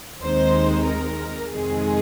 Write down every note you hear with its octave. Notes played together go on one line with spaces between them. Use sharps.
D#2 D#3 G#3 C4 D#4 C5
A#4
F2 C3 D#3 G#3 C4 G#4